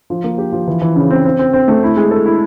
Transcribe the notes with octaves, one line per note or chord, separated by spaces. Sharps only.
F3
A#3
G4
F3
E3
E3
C#3
C4
C4
C4
C4
A3
E4
G#3
A4
E4